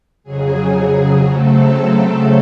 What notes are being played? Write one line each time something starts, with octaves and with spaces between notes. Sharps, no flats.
F2 C#3 F#3 G#4
C#3 F#3 A3 C4 A4